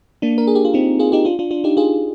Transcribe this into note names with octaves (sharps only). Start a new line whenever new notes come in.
A#3 D4
A#4
G#4
G4
F4
C4 D#4
F4 G#4
D#4 G4
D4 F4
D4 F4
D4 F4
D#4 G4
F4 G#4